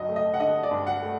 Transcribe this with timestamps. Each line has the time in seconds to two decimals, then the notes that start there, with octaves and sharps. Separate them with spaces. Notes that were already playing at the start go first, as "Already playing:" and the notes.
Already playing: G2 F#3 D#5
0.09 A3
0.16 D#5
0.34 F#5
0.40 D3 D#5
0.63 D5
0.71 G2
0.87 F#5
1.02 A3